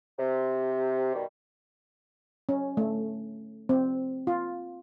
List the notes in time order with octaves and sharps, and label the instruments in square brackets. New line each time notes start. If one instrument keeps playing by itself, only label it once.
[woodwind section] C3
B2 D#3 G3
[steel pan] C#4
A3
C4
F4